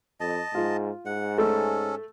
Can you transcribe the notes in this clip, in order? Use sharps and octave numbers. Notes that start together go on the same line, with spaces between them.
F2 D#5 A5
G#2 F4
G#2 F#5
A3 C#4 A4